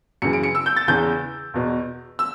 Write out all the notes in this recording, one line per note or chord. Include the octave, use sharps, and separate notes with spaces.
F#2 C#3 E3 C#7
D7
C#7
E6
G6
A6
E2 C#3 E3 G6
E2 B2
E6